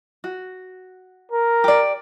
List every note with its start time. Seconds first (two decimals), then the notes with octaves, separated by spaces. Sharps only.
0.24 F#4
1.32 A#4
1.64 G4 D5